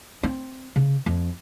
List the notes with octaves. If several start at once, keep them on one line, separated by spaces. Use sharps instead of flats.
C4
C#3
F2